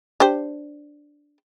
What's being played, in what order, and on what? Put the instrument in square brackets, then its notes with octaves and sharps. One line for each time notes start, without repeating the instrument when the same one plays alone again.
[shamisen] D4 G4 C5